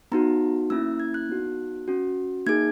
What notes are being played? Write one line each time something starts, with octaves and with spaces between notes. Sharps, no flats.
B3 D#4 F#4 A#5
A#3 C#4 E4 E6
G#6
F#6
B3 D#4 F#4
C#4 F#4
A#3 D#4 G#4 G#6